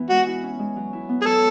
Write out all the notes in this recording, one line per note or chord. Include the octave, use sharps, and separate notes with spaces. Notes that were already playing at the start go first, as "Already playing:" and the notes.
Already playing: E3 B3
G#3 F#4
E4
C#4
G#3
F#3
E4
B3
G#4
F#3 A4